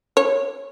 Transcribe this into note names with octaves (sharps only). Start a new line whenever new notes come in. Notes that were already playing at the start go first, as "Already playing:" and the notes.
C#5